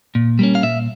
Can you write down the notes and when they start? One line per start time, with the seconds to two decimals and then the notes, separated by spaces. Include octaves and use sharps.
0.15 A#2
0.39 G3 A#3 C#4
0.55 F5
0.63 A#2 E5